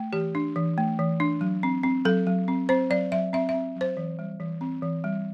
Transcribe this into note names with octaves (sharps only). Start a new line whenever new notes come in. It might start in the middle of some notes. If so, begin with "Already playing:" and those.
Already playing: A3
E3 G4
D4
E3
A3
E3
D4
F#3
C4
C4
F#3 A4
F#3
C4
C4 C5
F#3 D5
F#3 E5
C4 E5
E5
C4
F#3 C5
E3
G3
E3
C4
E3
G3